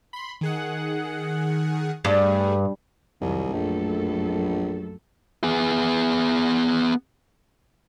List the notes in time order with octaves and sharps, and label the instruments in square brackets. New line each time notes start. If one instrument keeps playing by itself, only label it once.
[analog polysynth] B5 C6
D#3 G#4 F#5
[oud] G2 [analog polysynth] G3 A3 G#4
[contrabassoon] C2 [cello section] F2 D#3 F#3
[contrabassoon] A#1 [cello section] F#2 A3 A4
[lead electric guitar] B3 G#4